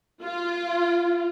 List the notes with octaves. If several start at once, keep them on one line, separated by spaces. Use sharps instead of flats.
F4